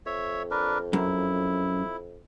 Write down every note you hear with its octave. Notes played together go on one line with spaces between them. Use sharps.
F2 C#5 E5
D4 A#4 B4
F#2 E4